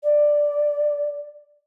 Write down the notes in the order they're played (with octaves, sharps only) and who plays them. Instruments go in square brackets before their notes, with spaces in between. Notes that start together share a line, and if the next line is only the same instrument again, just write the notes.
[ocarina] D5